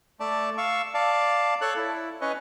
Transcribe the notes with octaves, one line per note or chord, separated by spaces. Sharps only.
A3 D5 A5
F5 C#6 E6
D5 F5 A5
A4 C#5 A5 F#6
E4
C#4 B4 C#5 D#5